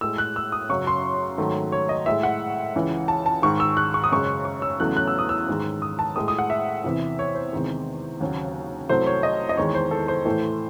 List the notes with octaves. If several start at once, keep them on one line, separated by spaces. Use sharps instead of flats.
A2 G#3 E6
F#6
E6
D#6
F#2 C#3 F#3 C#6
C6
G#2 D#3 F#3 A3
C#5
D#5
A2 G#3 E5
F#5
C#2 C#3 E3
A5
A5
G#2 D#3 G#3 C#6
E6
F#6
C#6
D#6
F#2 C#3 G#3 C#6
C#6
E6
E2 C#3 F#3 A3 F#6
F#6
E6
D#6
E6
G#2 D#3 G#3
D#6
A5
A2 G#3 D#6
D#6
F#5
E5
E2 C3 E3
C#5
C5
E2 C3 D#3 G#3
D#2 C#3 F#3
C2 C3 F#3 A3 C5
C#5
D#5
D#5
E2 D#3 G#3 C#5
C5
A4
C5
A2 E3 A3